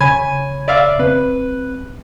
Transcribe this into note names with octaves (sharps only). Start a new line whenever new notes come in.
C#3 C#5 G#5 B5
D5 E5 F5
C4 B4